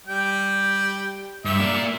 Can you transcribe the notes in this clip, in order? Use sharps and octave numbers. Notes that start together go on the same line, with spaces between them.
G3 G5
G2 E5
A#3 D5